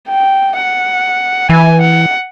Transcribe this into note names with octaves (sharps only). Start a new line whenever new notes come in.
G5
F#5
E3 G#5
F#5